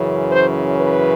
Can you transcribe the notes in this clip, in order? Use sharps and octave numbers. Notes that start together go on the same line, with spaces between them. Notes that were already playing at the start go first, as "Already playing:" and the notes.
Already playing: F#2 C#3 E3
C5
B4